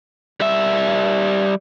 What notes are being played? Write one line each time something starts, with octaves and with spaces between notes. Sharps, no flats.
G3 E5